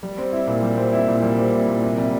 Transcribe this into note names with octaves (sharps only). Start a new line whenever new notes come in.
G3
C4
E4
A#2
G3
C4
E4
A#2
G3
C4
E4
A#2
C3
G3